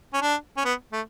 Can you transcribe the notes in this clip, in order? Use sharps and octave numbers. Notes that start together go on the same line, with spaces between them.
C#4
D4
C#4
B3
A3